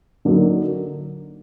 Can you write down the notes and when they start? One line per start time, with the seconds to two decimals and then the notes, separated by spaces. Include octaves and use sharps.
0.25 D3 F#3 A#3 D#4